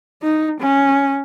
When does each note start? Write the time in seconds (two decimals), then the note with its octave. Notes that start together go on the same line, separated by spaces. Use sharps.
0.23 D#4
0.60 C#4